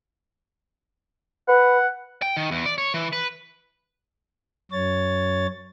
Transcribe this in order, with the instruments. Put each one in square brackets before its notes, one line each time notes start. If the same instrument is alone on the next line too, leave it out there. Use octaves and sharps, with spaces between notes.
[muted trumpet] B4 [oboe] F#5
[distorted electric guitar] G5
D#3
E2
D5
C#5
E3
B4
[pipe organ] F#2 C#5 A6